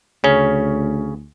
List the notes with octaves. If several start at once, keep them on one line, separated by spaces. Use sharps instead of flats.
D2 C#3 C#4